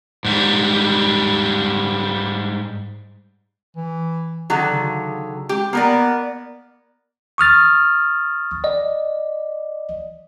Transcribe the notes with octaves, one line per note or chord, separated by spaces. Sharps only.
G#2 G3
E3
D3 D#3 F#3
C#3
G#3 G4
A#3 B3 A#4 D5
C#6 D#6 F6 A6
D5 D#5